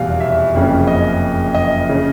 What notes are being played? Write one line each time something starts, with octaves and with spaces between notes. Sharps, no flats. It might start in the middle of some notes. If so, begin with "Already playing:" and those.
Already playing: F1 E2 B2 G3 F5
E5
F#1 F2 C#3
D#5
D#5
C#3